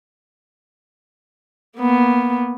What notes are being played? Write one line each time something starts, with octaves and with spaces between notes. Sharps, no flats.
A#3 B3